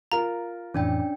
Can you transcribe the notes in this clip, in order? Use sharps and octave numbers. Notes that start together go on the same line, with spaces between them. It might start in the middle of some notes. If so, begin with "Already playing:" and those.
F4 A#4 A#5
F2 A2 E3 C#4 D4 G5